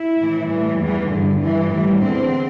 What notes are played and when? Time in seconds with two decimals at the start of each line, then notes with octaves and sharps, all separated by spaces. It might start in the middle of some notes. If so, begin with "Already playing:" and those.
Already playing: E4
0.18 A2 E3
0.49 A2 E3 G3
0.79 E2 E3
1.10 G2 D3
1.41 G2 E3
1.70 A2 E3 G3
2.01 E2 D3 C4